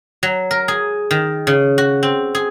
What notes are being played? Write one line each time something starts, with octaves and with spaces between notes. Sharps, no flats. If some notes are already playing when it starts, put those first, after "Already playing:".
F#3
A#4
G#4
D#3
C#3
F#4
C4
G#4